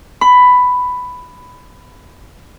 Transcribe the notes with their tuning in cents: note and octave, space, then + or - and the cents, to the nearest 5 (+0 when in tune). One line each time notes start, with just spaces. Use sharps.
B5 +10